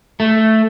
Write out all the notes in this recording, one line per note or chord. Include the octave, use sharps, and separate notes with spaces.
A3